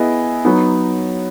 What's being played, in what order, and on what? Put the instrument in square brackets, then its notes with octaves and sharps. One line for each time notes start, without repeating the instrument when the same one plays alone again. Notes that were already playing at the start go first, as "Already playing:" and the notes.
Already playing: [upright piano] B3 E4 G#4 D#5
F#3 B3 D#4